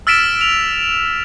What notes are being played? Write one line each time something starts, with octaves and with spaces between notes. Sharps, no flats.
E6 F6 A6 B6 D7 E7
F7